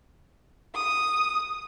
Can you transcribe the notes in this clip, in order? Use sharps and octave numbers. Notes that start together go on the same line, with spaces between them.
D#6